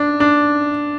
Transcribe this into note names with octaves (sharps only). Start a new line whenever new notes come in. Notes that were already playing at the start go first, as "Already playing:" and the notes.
Already playing: D4
D4